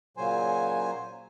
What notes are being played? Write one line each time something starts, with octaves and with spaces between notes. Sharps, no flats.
A#2 C#3 F#3 C5 G#5